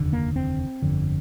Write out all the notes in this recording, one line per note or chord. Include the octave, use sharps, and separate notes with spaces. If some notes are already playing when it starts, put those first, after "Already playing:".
Already playing: F1 D#2 D3
A#3
C4
G1 F2 D3